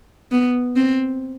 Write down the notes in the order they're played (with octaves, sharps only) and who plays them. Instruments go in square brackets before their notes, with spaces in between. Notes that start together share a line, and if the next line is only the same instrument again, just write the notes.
[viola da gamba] B3
C4